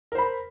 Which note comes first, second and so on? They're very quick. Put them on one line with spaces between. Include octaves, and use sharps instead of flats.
A#4 C5 B5